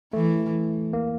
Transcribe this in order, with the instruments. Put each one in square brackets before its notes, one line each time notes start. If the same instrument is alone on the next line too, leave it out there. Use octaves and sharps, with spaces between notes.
[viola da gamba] E3 [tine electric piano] A3
[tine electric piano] A#3